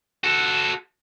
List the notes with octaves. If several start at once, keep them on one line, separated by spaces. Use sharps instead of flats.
F#4 A4